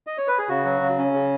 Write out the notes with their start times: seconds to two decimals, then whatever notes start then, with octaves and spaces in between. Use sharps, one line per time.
0.07 D#5
0.18 C#5
0.28 B4
0.38 G#4
0.49 C#3 F#4
0.65 F#3
0.81 C#3
0.99 C#4
1.14 C#3